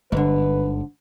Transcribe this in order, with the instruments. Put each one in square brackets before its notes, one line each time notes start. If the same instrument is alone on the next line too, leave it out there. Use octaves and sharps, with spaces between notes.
[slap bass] G1 [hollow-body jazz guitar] G#2 D3 [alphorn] B4